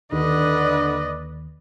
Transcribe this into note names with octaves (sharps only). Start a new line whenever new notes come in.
D#2 D3 B4 D5 D#5